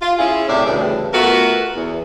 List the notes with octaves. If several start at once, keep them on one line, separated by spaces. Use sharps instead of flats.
F4
C#4 E4 G#4
A2 C3 C#4 D5 E5
D2 A2 C#3 E3 G3 D4
A3 B3 F4 F#4 A#4 B4
E2